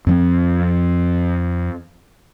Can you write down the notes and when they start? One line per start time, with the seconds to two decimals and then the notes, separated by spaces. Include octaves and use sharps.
0.07 F2 F3 C4